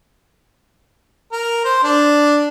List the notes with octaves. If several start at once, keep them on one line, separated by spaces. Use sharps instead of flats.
A#4
C5
D4